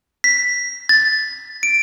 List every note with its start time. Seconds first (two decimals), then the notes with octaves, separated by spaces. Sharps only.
0.24 B6
0.89 A6
1.63 D7